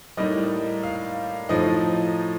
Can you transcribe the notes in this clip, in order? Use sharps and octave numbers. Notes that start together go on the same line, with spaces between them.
A2 G3 A#3 D#4 D#5
F5
A2 F3 A3 D#4 D#5